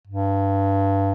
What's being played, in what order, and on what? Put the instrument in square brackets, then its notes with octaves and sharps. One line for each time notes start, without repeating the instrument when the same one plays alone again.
[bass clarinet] G2